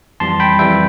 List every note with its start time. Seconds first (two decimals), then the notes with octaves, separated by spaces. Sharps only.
0.20 F2 E3 G3 A5 C6
0.40 G5 B5
0.59 F2 E3 G3 E5 G5